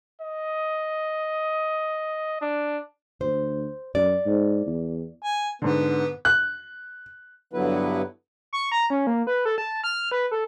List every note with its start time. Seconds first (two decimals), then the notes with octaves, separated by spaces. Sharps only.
0.21 D#5
2.41 D4
3.21 D2 C5
3.95 F#2 D5
4.26 G#2
4.67 E2
5.22 G#5
5.62 G#2 D3 B3
6.25 F#6
7.53 G2 D3 F#3 B3 E4 B4
8.53 C#6
8.72 A#5
8.90 C#4
9.07 A#3
9.27 B4
9.45 A4
9.58 A5
9.84 F6
10.11 B4
10.31 A4